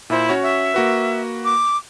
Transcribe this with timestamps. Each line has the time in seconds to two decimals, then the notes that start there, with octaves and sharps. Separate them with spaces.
0.10 A#2 E4 C5
0.29 C#4 F#4 C#5
0.43 E5
0.74 A#3 F#4 B4
1.45 D6